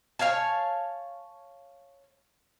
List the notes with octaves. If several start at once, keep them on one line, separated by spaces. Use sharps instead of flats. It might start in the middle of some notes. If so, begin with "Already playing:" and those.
C#5 F5 G#5 A5